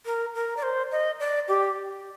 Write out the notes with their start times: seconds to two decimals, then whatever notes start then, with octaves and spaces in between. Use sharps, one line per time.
0.06 A#4
0.35 A#4
0.57 D5
0.63 C5
0.91 D#5
1.20 D5
1.48 G4